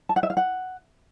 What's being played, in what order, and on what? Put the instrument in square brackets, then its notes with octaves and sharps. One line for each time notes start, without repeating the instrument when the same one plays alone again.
[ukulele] A5
F#5
E5
F5
F#5